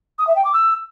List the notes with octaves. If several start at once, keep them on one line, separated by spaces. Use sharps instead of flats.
D#6
E5
G5
D6
E6